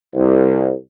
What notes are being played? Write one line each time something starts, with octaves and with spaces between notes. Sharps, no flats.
C2